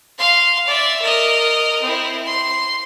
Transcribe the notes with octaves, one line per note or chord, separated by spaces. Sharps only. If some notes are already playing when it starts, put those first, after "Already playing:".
F5 C6
D5 E5
A#4 D#5
C4 E4
C6